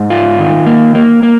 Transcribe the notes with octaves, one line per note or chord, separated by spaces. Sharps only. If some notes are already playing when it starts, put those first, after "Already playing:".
Already playing: G#2
F4
D#3
A#3
A#3
A#3